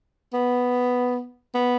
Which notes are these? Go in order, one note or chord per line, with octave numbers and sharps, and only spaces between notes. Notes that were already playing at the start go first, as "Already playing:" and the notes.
B3
B3